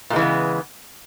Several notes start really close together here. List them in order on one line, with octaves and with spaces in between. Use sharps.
A#2 G#3 E3 C#3 B3